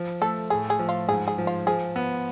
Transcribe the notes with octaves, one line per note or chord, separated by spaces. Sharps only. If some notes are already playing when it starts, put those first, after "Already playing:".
Already playing: F3
A3 A4
A2 G#4
G#4
F3
F4
G#2 G#4
G#4
F3
F4
F3 G#4
B3